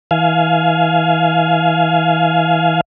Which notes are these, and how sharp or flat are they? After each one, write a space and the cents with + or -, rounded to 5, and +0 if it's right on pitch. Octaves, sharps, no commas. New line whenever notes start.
E3 -25 F5 +0 G#5 +30